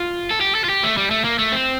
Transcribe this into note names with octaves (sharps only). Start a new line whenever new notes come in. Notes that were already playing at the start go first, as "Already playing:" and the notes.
Already playing: F4
A4
G4
A4
F4
G4
A3
G3
A3
A#3
A3
C4